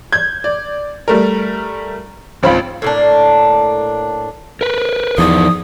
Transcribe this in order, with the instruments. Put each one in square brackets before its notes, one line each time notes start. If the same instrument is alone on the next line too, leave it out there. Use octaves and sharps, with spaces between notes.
[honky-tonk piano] G6 G#6
D5
G3 A3 A#4
G#1 C#2 C4 F4 F5 B5
[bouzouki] A2 A#3 D4
[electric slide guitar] A#4 B4
[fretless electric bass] E2 [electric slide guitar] F3 D#4 D5 [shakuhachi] D#6